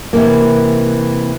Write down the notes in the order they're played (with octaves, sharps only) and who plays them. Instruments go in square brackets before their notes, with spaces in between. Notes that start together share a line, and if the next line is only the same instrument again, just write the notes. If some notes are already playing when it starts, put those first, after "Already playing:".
[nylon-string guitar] C3 E3 A#3